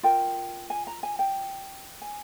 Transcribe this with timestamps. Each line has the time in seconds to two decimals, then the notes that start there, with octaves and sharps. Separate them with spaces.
0.03 F4 A#4 G5
0.70 G#5
0.87 A#5
1.03 G#5
1.19 G5
2.02 G#5